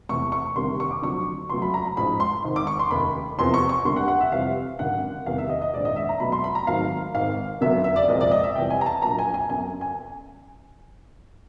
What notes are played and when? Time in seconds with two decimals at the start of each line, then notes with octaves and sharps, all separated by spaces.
0.09 E2 C3 E3 A3 C#6
0.32 C#6
0.56 D2 C3 D#3 G3 A#3 C6
0.80 C#6
0.91 D6
1.02 F1 F2 D3 F#3 C#6
1.49 C#2 C#3 F#3 A3 C6
1.62 B5
1.74 A#5
1.85 B5
1.97 A1 G#2 F3 G#3 B5
2.20 C6
2.44 G#1 G#2 D#3
2.56 D6
2.67 C#6
2.79 C6
2.91 F1 D#2 C#3 B5
3.38 F#1 E2 C3 F3 A#3 C6
3.54 C#6
3.69 C#6
3.85 D2 D3 G3 A#3 C6
3.96 F#5
4.08 F#5
4.20 E5
4.32 F2 C3 E3 G3 F5
4.79 G#1 F#2 D3 F#5
5.26 E2 C3 D#3 G3 A#3 F5
5.38 E5
5.49 D#5
5.62 D#5
5.73 A#1 G#2 D#3 G#3 D5
5.85 D#5
5.96 E5
6.09 A#5
6.20 C#2 B2 F#3 A3 B5
6.32 C6
6.44 B5
6.55 A#5
6.67 G#1 G#2 D#3 F#3 A3 F5
7.15 G#1 G#2 D#3 F5
7.61 G1 F#2 D3 F#3 A#3 E5
7.84 E5
7.96 D5
8.08 C2 A#2 F3 G#3 D#5
8.21 D5
8.31 D#5
8.43 E5
8.55 F2 C3 E3 G3 G5
8.70 G#5
8.81 A#5
8.86 A5
9.02 A#1 A#2 F#3 A#3 A#5
9.19 G#5
9.34 G#5
9.49 G1 F#2 C#3 G#5
9.81 G#5